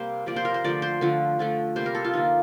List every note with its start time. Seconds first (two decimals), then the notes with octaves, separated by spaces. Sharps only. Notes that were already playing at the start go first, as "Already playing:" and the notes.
Already playing: C3 G3 A#3 C5
0.26 C3 F3 A#3 D5
0.36 C5
0.45 A#4
0.54 C5
0.64 D3 F3 A3 D5
0.82 C5
1.01 D3 F3 A3
1.39 D3 F3 A3
1.76 C3 G3 A#3 C5
1.86 A#4
1.95 A4
2.04 F4
2.13 D3 F3 A#3 D#4